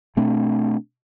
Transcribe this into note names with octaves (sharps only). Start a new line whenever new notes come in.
B2 A3 C4 D4